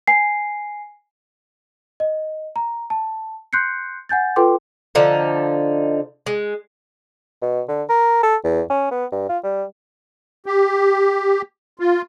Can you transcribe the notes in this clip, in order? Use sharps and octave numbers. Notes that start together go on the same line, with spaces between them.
G#5 C7
D#5
A#5
A5
C6 F#6 G6 C7 C#7
F#5 G#5 G6 A6
F4 A4 B4 G5 C6 D6
D3 F3 D#4
G#3
B2
D3
A#4
A4
E2
C#4
B3
G2
F4
G3
G4
F4